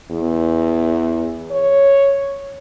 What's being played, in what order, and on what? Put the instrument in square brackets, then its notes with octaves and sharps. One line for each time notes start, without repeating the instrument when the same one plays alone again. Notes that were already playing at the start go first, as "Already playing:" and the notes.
[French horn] E2
C#5